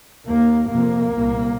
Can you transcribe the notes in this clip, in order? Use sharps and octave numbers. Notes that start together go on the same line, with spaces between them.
D#2 A#3
F2 C3 A#3
C2 A#2